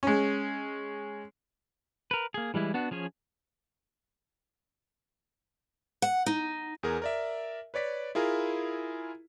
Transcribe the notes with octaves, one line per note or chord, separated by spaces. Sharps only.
G#3 C#4
A#4 B4
A#3 G#4
E3 G3 G#3 E4
B3 D4 F#4
F3 C#4 G#4 C#5
F#5
D#4
E2 G#4 A#4
A#4 D5 E5
B4 C#5 D5 B6
E4 F4 G#4 A#4